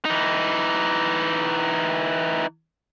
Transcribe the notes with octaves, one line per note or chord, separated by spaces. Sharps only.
E3 D#4